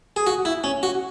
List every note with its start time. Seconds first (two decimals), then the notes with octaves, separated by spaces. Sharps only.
0.16 G#4
0.27 F#4
0.45 E4
0.64 C#4
0.83 F#4